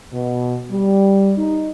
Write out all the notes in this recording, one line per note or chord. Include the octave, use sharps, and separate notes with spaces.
B2
G3
D#4